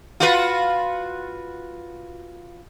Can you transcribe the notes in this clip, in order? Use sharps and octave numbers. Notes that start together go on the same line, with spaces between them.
F4 F#4 B4